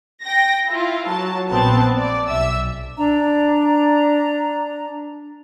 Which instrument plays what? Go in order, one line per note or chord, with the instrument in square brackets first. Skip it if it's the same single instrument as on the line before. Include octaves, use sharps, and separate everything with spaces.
[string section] G5 A#6
E4 F4
F#3 A5
A#1 B3 C4 A5
D5
B1 E5 E6
[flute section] D4 A#5